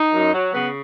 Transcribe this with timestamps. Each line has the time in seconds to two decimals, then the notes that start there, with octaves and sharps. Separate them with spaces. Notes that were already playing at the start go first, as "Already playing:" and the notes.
Already playing: D#4
0.14 F#2
0.33 F#3
0.54 C#3 B3